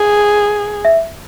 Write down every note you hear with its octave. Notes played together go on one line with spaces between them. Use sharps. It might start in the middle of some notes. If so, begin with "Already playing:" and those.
Already playing: G#4
E5